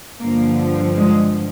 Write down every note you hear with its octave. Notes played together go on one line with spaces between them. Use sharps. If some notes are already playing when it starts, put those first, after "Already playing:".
G2 D3 F3 A#3
G#3